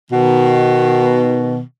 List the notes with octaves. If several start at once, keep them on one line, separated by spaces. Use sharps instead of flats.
B2 D#3